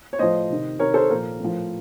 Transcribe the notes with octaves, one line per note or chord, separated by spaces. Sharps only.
C#5
A2 F3 C5 D#5
C3 D#3
C3 D#3 A#4 C#5
A4 C5
A#2 F3 A#4
A2 F3